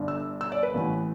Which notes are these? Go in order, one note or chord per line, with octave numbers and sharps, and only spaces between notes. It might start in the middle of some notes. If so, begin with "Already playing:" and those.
Already playing: G1 G2 D3
E6
E6
D5
B4
A1 A2 E3